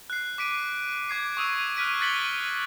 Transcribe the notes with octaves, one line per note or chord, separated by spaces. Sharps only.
F#6 C7
D6 B6 D7 D#7
D6 G#6 C7
C#6 D#6 E6 D#7
F6 F#6 B6 D7 D#7
F#6 A6 B6 C#7 F#7 G7